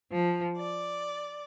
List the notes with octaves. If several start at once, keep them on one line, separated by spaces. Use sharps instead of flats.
F3
D5